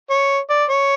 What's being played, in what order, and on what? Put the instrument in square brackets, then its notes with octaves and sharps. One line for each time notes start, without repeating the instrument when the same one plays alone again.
[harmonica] C#5
D5
C#5